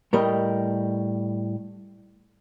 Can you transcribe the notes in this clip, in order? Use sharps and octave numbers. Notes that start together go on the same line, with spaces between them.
A2 G3 A#4 D#5